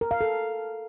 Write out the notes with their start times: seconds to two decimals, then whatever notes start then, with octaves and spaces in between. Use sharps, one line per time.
0.01 A#4
0.11 F5
0.21 A4